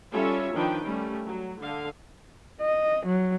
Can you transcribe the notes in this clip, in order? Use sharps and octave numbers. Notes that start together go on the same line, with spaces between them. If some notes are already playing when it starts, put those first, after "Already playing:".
G3 C#4 F4 A4 C#5 E5
D#3 F3 D4 D#4 B4 G5
G3 A3 C#4
F#3
D3 F5
D#5
F#3